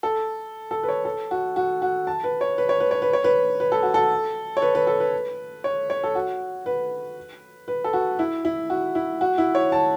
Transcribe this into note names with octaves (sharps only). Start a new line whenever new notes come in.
A4
A4
B4
C#5
A4
F#4
F#4
F#4
A5
B4
C#5
B4
C#5
B4
C#5
B4
C#5
B4
B4
A4
F#4
A4
C#5
B4
B4
A4
B4
C#5
C#5
A4
F#4
B4
B4
A4
F#4
E4
E4
F#4
E4
F#4
E4
C#5
A5